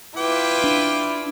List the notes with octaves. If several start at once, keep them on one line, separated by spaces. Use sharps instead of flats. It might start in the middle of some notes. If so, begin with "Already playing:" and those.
E4 F4 B4 G5 D6
D4